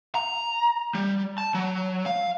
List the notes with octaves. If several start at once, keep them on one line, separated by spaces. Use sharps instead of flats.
A#5
G3
A5
F#3
F5